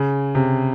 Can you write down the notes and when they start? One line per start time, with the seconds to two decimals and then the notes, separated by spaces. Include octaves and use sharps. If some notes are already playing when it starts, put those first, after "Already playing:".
Already playing: C#3
0.35 C3